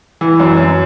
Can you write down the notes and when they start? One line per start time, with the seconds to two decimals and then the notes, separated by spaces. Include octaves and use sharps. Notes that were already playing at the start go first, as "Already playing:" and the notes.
0.21 E3
0.40 F#2
0.57 F#2